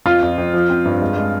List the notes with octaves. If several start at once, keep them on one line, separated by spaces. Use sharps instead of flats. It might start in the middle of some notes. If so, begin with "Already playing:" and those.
F2 F4
F2
F2
F3
C4
G2
G#3
G#3